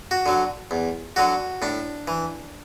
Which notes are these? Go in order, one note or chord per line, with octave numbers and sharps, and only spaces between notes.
F#4
D3 F#3
E2
D3 F#3 F#4
A2 D4
E3